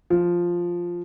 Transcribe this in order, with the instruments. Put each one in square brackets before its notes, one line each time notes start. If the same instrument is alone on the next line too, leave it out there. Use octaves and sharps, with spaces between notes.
[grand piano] F3